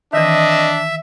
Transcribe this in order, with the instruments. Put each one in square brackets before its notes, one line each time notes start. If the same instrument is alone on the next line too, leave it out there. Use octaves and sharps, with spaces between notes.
[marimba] D#3 E3 [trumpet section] C4 D#5 [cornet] D4 [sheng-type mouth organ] E5